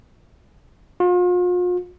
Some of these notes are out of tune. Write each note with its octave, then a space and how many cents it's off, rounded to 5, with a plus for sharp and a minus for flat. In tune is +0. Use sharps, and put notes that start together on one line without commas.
F4 +40